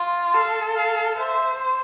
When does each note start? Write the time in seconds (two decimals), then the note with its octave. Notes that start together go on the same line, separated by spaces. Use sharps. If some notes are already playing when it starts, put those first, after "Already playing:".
Already playing: F4
0.34 A4 F5
0.76 F5
1.17 C5 E5